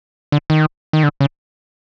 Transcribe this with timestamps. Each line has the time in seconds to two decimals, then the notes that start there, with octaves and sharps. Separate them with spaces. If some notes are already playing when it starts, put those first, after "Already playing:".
0.32 D3
0.50 D#3
0.93 D#3
1.03 D3
1.21 C#3